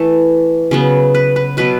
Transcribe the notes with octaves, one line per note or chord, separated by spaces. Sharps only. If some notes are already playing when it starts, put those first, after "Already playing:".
Already playing: E3 A3 E4 A4
C#3 F#3 B3
B4
B4
B2 F#3 B3 B4